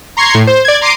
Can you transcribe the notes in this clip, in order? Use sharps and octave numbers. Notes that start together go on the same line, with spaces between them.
A#5 C6 C#6 G#6 C7
A2
C5
D5 G#6
A#5 C6 D6 C7 D7 D#7